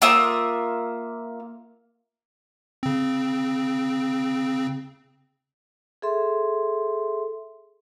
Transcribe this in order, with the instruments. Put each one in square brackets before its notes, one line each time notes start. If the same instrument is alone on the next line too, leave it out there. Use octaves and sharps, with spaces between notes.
[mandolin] A#3 F4 E5 D#6
[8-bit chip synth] C#3 C4
[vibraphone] G#4 A4 E5 C6